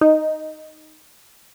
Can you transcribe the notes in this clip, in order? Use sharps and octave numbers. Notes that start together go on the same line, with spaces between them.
D#4